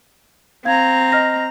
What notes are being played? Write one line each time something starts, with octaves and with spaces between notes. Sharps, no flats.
C4 F5 A#5 G#6
D#5 F6 A#6